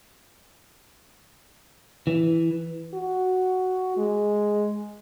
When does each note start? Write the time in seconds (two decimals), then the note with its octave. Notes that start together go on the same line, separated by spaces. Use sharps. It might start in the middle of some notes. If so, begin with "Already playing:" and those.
2.07 E3
2.94 F#4
3.97 G#3